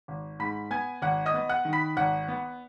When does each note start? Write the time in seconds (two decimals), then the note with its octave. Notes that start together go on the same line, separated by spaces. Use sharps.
0.08 G#1
0.39 G#2 B5 B6
0.71 B3 G#5 G#6
1.02 G#1 F#5 F#6
1.26 D#5 D#6
1.34 B3
1.49 F#5 F#6
1.65 D#3
1.73 B5 B6
1.97 G#1 F#5 F#6
2.28 B3